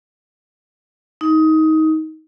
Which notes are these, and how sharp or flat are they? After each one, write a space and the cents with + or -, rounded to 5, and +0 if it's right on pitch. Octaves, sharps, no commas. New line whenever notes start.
D#4 +20